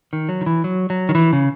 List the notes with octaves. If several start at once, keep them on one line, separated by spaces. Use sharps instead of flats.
D#3
F#3
D#3
E3
F#3
F#3
D#3
E3
C#3